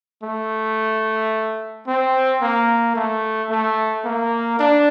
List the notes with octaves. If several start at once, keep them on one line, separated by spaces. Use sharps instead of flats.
A3
C4
A#3
A3
A3
A#3
D4